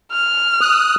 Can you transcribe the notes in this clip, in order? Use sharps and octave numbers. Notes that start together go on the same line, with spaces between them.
F6
D#6 F#6